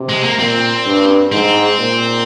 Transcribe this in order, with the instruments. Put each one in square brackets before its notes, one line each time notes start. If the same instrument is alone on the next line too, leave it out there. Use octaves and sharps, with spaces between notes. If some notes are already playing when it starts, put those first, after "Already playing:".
Already playing: [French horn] C3
[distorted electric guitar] G#3
A#3
[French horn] A#2 [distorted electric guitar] C4
[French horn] G2
[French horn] G#2 [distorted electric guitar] C4
[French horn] A#2